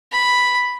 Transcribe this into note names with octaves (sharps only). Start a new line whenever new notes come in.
B5